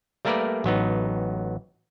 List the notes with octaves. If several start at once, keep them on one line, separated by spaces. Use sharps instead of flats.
G3 A3 A#3 A#4 B4 D5
A1 F#3 B3 D#4